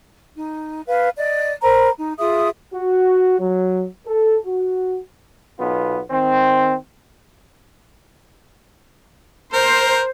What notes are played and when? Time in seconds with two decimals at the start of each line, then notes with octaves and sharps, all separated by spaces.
0.37 D#4
0.87 B4 F5
1.17 D5 D#5
1.62 A#4 C5 A#5 B5
1.97 D#4
2.18 F4 G#4 E5 D#6
2.73 F#4
3.39 F#3
4.06 A4
4.45 F#4
5.59 B1 B3 F4
6.10 D#3 C4
9.53 A#4 C5